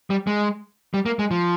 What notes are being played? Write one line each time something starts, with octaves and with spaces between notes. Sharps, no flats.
G3
G#3
G3
A#3
G#3
F3